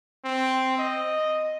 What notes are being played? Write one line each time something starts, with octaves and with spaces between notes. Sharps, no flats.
C4
D#5